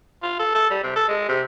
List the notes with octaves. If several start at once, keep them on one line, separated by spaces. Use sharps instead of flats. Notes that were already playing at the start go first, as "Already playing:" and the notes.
F4
A4
A4
G3
C3
A4
G#3
C3